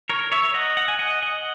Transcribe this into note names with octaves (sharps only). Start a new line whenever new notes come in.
A#4 C#5
C#5 E5
D#5 F#5
F#5
G#5
D#5 F#5
D#5 F#5